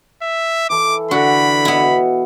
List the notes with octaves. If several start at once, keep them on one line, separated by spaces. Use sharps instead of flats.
E5
E3 A4 D6
D3 F#4 G#5 B5
B2 B3 E4